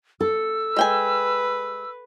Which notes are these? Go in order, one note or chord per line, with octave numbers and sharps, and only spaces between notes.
A4 E6
G#3 B4 G5 G#5